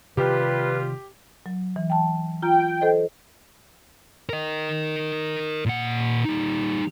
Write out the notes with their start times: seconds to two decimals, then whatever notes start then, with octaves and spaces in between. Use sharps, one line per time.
0.17 C3 D#3 F3 G3 F4 G4 B4
1.46 F#3
1.76 E3
1.90 G5 A5
2.42 F4 G5 A#5
2.81 A4 C5 D#5
4.29 A#4 D#5
5.66 A#2 F#5
6.25 G3 D#4